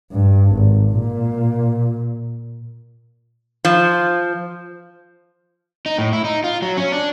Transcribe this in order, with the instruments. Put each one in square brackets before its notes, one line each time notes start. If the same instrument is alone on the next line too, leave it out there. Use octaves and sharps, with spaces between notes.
[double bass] G2
G#1
A#2
[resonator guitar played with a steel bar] F3
[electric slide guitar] D#4
A2
E4
D#4
F4
F#3
C#4
D4